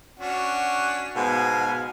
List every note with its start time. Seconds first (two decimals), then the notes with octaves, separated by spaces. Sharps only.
0.20 C#4 D4 F#4 F#5
1.16 G#2 B2 B3 F5 G#5